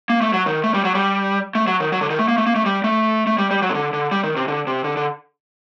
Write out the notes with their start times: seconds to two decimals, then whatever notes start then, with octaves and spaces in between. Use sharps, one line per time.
0.10 A#3
0.21 A3
0.33 F#3
0.46 D#3
0.64 A3
0.74 G3
0.84 F#3
0.95 G3
1.55 A3
1.67 F#3
1.80 D#3
1.92 F#3
2.01 D3
2.10 D#3
2.19 A3
2.28 A#3
2.38 A3
2.46 A#3
2.56 A3
2.66 G3
2.84 A3
3.27 A3
3.38 G3
3.51 G3
3.62 F#3
3.70 C3
3.75 D3
3.93 D3
4.11 G3
4.24 D#3
4.36 C3
4.48 D3
4.67 C3
4.84 D3
4.97 D3